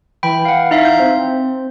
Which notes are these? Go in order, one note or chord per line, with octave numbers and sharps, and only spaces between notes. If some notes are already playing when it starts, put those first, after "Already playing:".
E3 G5 B5
F5 F#5
D#4 E5 F5
G6
C4